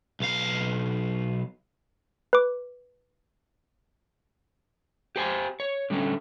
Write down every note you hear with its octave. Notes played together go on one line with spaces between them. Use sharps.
B1 F5
B4 D6
G4 C5 G#5
C#5
D3 G3 A3 C#4